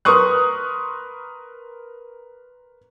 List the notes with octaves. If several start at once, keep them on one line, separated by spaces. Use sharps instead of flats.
A#4 B4 C6 C#6 D#6 F#6